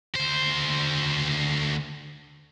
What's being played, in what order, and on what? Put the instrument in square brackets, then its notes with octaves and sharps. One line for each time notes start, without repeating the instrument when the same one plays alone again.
[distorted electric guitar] D2 C5